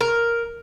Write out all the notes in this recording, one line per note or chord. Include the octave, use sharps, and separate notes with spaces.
A#4